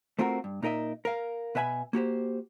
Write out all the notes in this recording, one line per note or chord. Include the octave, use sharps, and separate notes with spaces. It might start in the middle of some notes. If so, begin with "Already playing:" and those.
A3 C4 F4 F#4 A#4
G2
A#2 D#4 A#4 D#5 E5
A#4 F5
B2 B4 E5 G#5 B5
A#3 F#4 G4 C5